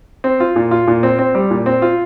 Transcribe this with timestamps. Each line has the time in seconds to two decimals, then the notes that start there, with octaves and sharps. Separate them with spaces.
0.24 C4
0.40 F4
0.56 A#2
0.71 F4
0.87 A#2
1.03 C4
1.19 C4
1.35 G3
1.51 A#2
1.66 C4
1.82 F4